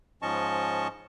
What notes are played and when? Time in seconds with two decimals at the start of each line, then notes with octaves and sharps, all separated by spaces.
0.22 G#2 F3 C#4 D#5 A5 C#6